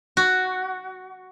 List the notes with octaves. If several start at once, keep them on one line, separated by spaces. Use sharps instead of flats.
F#4